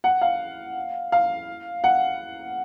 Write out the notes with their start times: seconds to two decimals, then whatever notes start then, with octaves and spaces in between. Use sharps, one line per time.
0.04 F#5
0.21 F5
1.12 F5
1.84 F#5